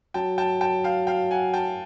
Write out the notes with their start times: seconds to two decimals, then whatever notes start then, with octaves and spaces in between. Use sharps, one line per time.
0.14 F#3 G5 A5
0.38 G5 A5
0.61 G5 A5
0.84 F5 G5
1.07 F5 G5
1.31 F#5 G#5
1.54 G5 A5